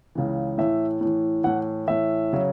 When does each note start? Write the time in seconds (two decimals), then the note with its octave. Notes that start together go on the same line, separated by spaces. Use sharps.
0.15 C#2 C#3 E3
0.58 A2 E3 E5
1.01 A2 E3
1.44 A2 E3 F#5
1.88 A2 E3 E5
2.33 C#3 F#3